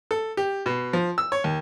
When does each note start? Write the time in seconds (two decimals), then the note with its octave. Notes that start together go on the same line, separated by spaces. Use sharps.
0.11 A4
0.37 G4
0.66 B2
0.93 F3
1.18 E6
1.32 C#5
1.44 D#2